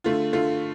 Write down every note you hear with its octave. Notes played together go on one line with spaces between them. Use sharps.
D3 A3 F4
D3 A3 F4